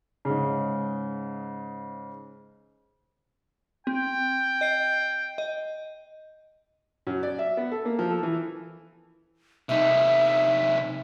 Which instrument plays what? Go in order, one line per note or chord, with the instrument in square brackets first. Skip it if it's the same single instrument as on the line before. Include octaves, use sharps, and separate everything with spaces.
[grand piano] G#2 C#3
[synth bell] C4 [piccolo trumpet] G5
[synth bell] D#5 C7
D#5
[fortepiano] F#2
D5
E5
B3
A4
A#3
F3
A4
E3
[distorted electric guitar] C3 D#4 [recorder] E5